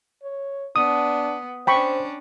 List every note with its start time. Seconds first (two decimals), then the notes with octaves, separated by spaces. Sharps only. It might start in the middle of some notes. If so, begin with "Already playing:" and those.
0.23 C#5
0.76 B3 D4 D#6
1.67 C#4 D4 C5 G5 B5 C#6